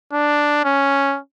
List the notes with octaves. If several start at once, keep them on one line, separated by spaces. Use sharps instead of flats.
D4
C#4